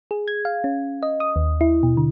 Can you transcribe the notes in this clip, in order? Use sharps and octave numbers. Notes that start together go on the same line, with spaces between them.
G#4
G#6
F5
C#4
D#5
D#6
D#2
E4
B2
D3